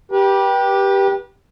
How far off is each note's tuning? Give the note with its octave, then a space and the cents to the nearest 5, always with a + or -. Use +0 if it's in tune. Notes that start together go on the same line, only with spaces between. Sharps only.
G4 +0 B4 -35